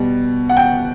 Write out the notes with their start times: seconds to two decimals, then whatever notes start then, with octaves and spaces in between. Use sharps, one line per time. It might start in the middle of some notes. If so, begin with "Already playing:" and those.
Already playing: B2 G3
0.49 F#5
0.57 G5